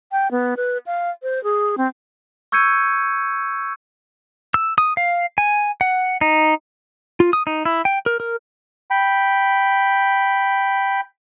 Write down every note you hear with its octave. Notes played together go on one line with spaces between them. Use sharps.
G5
B3
B4
F5
C5
G#4
C4
C#6 E6 G6 G#6 C#7 D#7
E6
D#6
F5
G#5
F#5
D#4
F4
D#6
D#4
E4
G5
A#4
A#4
G5 B5